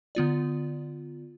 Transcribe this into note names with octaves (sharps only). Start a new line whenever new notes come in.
D3 B3 F4 D5